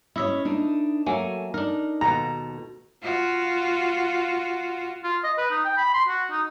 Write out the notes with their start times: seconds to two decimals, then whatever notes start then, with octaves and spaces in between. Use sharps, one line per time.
0.16 C#4 E4 C#5 D#5 E5
0.45 D4 D#4 A#4
1.06 F#3 A3 A#3 A4 G#5
1.54 D4 D#4 A#4
2.01 D#2 B2 A4 A#5
3.03 F4 F#4
5.04 F4
5.24 D#5
5.38 B4
5.51 D#4
5.65 G5
5.77 B5
5.94 C6
6.08 F#4
6.31 D#4